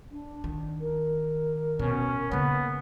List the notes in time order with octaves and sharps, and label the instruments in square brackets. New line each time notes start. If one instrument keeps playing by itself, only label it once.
[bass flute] D4
[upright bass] D#3
[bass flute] A#4
[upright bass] B2 [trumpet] C#4
[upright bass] C#3 A#3 [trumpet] B3